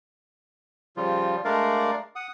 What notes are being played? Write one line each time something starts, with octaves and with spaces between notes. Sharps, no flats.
C#3 F3 G3 F4
G#3 A3 D4 A#4 D5 F5
F#5 D#6